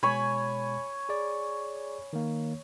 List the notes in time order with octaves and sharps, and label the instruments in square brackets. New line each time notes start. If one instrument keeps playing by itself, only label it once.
[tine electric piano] B2 G#3 [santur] C#5 G#5 B5
[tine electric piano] G#4 D5
D#3 A#3